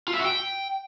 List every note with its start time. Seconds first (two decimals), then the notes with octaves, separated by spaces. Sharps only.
0.08 F4
0.14 E5
0.19 F#4
0.25 G5